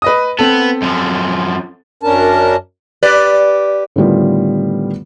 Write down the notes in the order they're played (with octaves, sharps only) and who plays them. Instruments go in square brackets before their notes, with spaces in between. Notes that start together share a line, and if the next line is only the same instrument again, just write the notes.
[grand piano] B4 D#5 D#6
[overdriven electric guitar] B3 [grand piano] C4 A4
[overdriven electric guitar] F#2 F3
[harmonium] F#2 C#4 D4 A#4 A5
[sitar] G4 B4 D5
[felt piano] A2 D3 D#3 G3 B3 F4